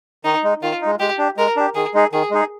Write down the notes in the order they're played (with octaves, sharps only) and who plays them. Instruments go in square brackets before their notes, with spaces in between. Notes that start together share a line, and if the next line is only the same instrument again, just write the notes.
[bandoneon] D#3 [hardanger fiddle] D#4
[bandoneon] G#3 D#4
[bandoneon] D#3 [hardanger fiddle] F4
[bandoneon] G#3 D#4
[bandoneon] G#3 [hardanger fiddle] G4
[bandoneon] D4 G4
[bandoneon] G#3 [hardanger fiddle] A#4
[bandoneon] D4 G4
[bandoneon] D#3 [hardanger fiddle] G#4
[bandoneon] G#3 D#4 G#4
[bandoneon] D#3 [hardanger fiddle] G#4
[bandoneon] G#3 D#4 G#4